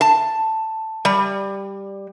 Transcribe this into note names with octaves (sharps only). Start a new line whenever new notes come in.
A5
G3